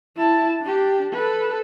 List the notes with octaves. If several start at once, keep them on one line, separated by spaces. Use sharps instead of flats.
E4 A5
D4 G4
A4 B4